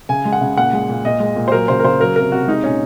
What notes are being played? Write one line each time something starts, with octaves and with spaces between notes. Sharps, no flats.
C#3 G#5
G#3
F#5
C#3
A#2 F#5
G#3
A#2
A#2 D#5
G#3
A#2
C5
F#3 A#4
C#3 C5
A#4
C#3 C5
F#3 A#4
C3 A#4
C3 F#4
G#3 D#4
A#2 C#4